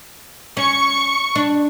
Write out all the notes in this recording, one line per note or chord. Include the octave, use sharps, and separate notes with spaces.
C#4 C#6
D4